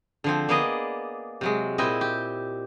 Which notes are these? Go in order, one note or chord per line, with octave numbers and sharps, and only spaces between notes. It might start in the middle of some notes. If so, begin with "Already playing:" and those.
D3 F3 C4
A#3 B3 G#4 D5 D#5
C3 F#3 G#3
A#2 C4 E4 D#5
G4